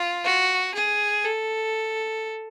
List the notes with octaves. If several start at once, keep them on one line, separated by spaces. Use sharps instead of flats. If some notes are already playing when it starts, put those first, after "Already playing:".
Already playing: F4
F#4
G#4
A4